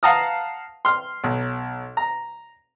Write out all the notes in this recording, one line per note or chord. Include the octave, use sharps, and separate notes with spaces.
F5 F#5 A5 A#5 D#6 F6
C6 F6
B1
A#5